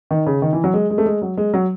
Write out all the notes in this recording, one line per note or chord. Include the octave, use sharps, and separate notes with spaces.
D#3
C#3
D#3
E3
F#3
G#3
G#3
A3
G#3
F#3
G#3
F#3